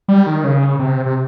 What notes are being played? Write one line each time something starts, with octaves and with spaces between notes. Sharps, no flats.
G3
D#3
C#3
C3
C3